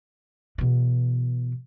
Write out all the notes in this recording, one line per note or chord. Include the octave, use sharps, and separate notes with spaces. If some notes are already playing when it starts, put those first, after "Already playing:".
B2 E3